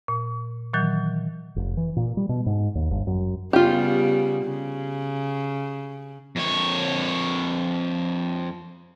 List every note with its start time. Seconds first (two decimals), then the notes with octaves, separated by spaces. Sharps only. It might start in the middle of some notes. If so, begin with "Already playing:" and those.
0.08 A#2
0.74 A#2 D#3 E3 F#3
1.56 F1
1.77 E3
1.97 A#2
2.17 G3
2.29 B2
2.46 G#2
2.75 D#2
2.91 G1
3.07 F#2
3.53 C#3 G3 B3 F4 G4
4.45 C#3
6.36 F2 C#5